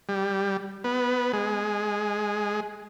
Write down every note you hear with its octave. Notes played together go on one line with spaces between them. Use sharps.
G3
B3
G#3